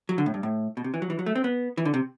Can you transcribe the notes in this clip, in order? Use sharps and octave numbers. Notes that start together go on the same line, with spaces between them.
F#3
D3
A2
G2
A2
B2
C3
E3
F#3
E3
F#3
A3
C4
B3
E3
D3
C3